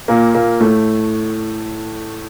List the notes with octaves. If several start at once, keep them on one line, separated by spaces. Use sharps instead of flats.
A#2 A#3
A#2 A#3
A2 A3